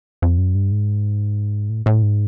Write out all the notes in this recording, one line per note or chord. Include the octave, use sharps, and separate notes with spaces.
F2
F#2
G2
G#2
A2
A2
G#2